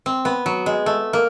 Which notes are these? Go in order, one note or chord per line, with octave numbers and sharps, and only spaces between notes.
C4
B3
F#3
G#3
A3
A#3